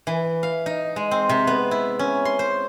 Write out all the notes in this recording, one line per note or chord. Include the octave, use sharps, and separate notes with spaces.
E3
F5
D#4
G#3
C4
C3
B3
E4
C#4
C6
C5